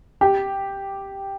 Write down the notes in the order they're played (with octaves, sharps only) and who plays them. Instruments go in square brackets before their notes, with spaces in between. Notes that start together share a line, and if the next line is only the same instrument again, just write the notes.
[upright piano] G4